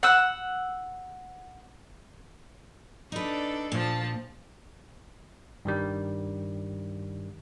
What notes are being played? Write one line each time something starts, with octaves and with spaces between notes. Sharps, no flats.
F#5 E6
D4 D#4 A4 B4 D5
A#2 F3 A5
G2 D#3 G3